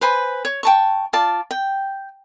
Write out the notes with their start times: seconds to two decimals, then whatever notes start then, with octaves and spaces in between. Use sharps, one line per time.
0.01 B4 C5 G#5 B5
0.45 C#5
0.63 G5 A5 C#6
1.13 F4 D5 A5
1.51 G5